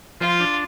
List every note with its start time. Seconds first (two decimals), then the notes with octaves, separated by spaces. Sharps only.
0.20 F3 F4
0.40 D4